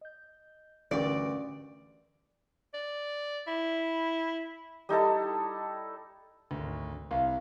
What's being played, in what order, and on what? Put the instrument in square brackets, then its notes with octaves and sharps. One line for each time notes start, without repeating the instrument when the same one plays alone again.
[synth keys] D#5 G6
[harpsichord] D2 G2 [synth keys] E3 C#4 A#4 [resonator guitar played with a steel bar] D5
[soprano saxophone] D5
E4
[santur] G3 D#4 E4 A4
[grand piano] G#1 D2
[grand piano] C2 [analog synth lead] F5